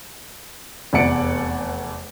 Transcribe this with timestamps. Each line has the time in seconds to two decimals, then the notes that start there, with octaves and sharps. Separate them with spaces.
0.93 F1 E2 D5 F#5 C#7 D7